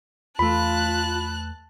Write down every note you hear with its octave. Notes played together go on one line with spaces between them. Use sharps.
E2 A3 F4 A5 B5 F#6